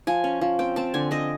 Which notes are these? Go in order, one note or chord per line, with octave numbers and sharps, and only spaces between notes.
F3 G#5
C#4
F3
C4 G5
C4 A5
D3 G#5
C4 D#5